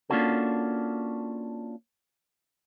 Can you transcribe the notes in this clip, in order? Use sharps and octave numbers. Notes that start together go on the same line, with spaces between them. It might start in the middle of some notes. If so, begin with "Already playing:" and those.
A#3 C#4 D4 F4 F#4 A4